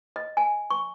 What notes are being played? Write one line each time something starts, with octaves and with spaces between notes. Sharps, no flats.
D#5
G#5
C#6